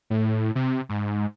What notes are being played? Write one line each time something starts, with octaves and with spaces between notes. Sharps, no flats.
A2
C3
G#2